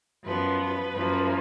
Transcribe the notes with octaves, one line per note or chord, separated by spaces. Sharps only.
F#2 F3 B3 B4
B4
F#2 F3 A#3